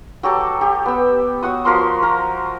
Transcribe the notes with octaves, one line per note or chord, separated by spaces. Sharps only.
F#3 G4 A4 D6
G4
B3 E6
F#4 C#5 F#5 D#6
F3 F#4 A#4 C6
A#4 A#5